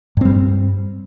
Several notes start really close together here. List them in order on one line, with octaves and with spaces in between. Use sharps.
G2 C4 G3